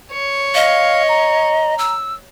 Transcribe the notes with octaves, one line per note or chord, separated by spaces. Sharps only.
C#5
D#5 F5
A#5
E6